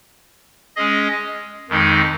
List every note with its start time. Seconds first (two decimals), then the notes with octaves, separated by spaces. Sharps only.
0.76 G#3 C#4 G#4 D#5
1.69 F2 D#3 G#3 D#4